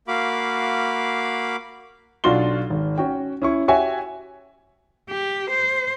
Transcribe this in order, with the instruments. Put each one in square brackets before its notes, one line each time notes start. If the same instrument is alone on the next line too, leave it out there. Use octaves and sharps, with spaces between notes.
[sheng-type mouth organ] A#3 F#4 F5 B5 D6
[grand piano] B1 D4 F4 F#4 C6 G7
G#1
C#4 F#4 G5
C#4 E4 C#6
F#4 G4 C#5 E5 F#5 G#5
[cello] G4
C5